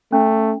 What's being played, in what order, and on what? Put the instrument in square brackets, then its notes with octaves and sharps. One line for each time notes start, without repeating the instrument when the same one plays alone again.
[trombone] A3 [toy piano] C#4